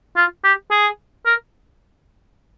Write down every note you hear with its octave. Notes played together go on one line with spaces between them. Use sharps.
F4
G4
G#4
A#4